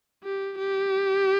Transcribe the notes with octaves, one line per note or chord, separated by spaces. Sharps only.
G4
G4